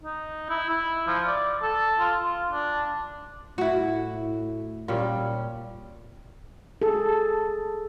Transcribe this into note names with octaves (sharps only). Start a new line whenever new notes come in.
D#4
E4
E4
F3
D5
A4
F4
F4
D4
A2 E4 F#4
A#2 G3 C#4
G#4 A4